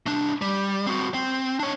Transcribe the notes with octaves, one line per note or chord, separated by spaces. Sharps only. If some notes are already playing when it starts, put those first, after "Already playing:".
C2 D4
G3
C4 F#4
C4
D4 C#5